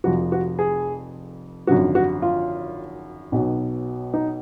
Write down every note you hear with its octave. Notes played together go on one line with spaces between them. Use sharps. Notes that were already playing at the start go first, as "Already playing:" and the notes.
F1 F2 F3 F#4
F#4
G#4
G#1 F#2 D3 F3 F#4
F#4
F4
B1 B2 F#3
D#4